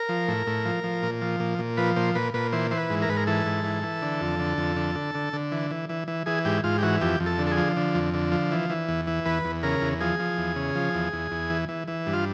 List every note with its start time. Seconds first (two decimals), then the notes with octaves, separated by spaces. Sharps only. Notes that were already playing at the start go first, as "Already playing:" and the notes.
Already playing: A#4
0.09 F3
0.28 A2
0.47 A2
0.65 F3
0.84 F3
1.03 A#2
1.21 F3
1.40 A#2
1.59 A#2
1.77 F3 B4
1.96 A#2 C5
2.15 A#2 B4
2.34 A#2 B4
2.52 E3 C5
2.71 E3 C5
2.78 B4
2.90 G#2
3.02 A#4
3.09 G#2 B4
3.17 A#4
3.27 E3 A4
3.46 G#2
3.64 E3
3.83 E3
4.02 D3
4.21 F2
4.40 D3
4.58 F2
4.76 D3
4.95 D3
5.15 D3
5.33 D3
5.52 E3
5.71 E3
5.89 E3
6.08 E3
6.26 E3 G#4
6.45 G#2 G4
6.64 G#2 F4
6.78 G4
6.83 E3 F#4
7.01 F2 G4
7.20 F2
7.26 A4
7.39 D3
7.47 A4
7.51 G#4
7.57 F3
7.76 D3
7.95 F2
8.14 D3
8.32 F3
8.51 E3
8.70 E3
8.89 E2
9.07 E3
9.25 E2 B4
9.45 E2
9.63 C#3 A#4
9.81 E2
10.01 F3 G#4
10.19 F3
10.38 E2
10.56 C#3
10.75 F3
10.94 E2
11.13 E2
11.32 E2
11.50 E3
11.69 E3
11.88 E3
12.06 G2
12.13 F4